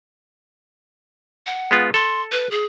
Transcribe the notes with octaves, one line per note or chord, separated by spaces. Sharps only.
F#5
G#3 B3 F4
A4 C6
B4
G#4